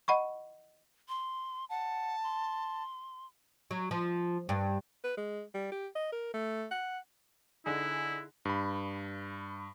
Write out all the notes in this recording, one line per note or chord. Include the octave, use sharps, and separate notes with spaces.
D#5 F#5 B5 C#6
C6
F#5 A5
C6
F#3
F3
G2
B4
G#3
G3
G4
D#5
A#4
A3
F#5
D3 D#4 E4 G#4
G2 B5